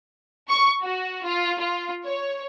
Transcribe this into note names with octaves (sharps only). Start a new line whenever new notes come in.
C#6
F#4
F4
F4
C#5